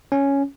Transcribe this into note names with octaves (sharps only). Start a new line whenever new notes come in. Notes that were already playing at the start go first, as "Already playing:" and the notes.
C#4